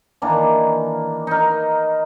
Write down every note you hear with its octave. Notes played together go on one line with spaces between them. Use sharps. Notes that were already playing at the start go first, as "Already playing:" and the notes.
D#3 E3 A#3 D4
D#4 A#4